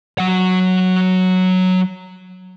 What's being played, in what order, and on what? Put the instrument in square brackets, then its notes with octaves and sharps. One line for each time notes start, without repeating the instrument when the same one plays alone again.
[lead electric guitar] F#3 F#5